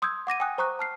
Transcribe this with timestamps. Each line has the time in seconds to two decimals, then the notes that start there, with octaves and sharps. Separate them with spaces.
0.02 C6 D#6 E6 G6 G#6
0.27 F#5 D6 A#6 D#7
0.40 G5 G#5 D#6 F#6
0.58 C5 A#5 C#6 D#6 F#6
0.79 A5 F6 C7